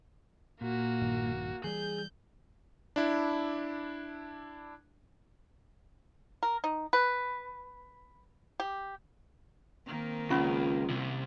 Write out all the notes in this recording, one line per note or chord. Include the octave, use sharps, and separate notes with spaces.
A#2 A#3 F#4
A#1 G2 D#3
E3 G3 G#4 G6
D4 E4
A#4
D#4
B4
G4
D#3 A#3 C4
C#2 C#4 F4 B5 C#6
C2 C3